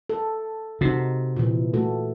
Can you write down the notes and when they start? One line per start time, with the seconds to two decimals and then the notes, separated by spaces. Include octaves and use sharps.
0.09 A4
0.81 C3 D#4 F#4
1.36 A#2 E3
1.74 A3 F#4 A4